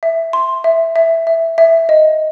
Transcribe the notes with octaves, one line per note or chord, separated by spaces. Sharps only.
E5
C6
E5
E5
E5
E5
D#5